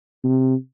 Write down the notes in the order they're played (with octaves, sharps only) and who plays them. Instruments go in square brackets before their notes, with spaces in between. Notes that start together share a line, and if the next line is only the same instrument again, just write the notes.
[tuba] C3